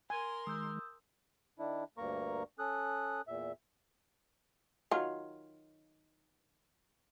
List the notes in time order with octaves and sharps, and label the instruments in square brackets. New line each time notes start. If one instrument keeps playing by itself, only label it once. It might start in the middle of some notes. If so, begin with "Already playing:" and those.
[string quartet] A#4 C6 [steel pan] G#5
[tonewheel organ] D#3 G#3 [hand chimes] D#6 E6 G6
[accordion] D#3 D4 E4
D2 G2 A#3 A#4 A#5 C#6
C#4 A4 D#6 F#6
E2 A#2 E5
[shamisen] D#3 F#3 F4